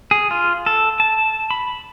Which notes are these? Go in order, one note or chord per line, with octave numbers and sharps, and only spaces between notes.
G#4
F4
A4
A5
B5